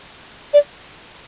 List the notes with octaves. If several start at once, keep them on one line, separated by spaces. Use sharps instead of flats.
D5